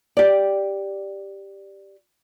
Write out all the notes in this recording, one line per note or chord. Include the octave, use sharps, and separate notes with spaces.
G4 D5